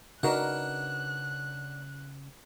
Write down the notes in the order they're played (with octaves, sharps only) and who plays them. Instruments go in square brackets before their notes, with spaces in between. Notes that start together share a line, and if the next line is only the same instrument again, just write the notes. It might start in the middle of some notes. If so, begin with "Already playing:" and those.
[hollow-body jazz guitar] C#3 B4 [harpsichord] D4 F#5 [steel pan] D#4 F#4 A#4 [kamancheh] F#6